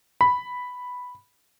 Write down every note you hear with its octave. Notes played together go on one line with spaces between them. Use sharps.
B5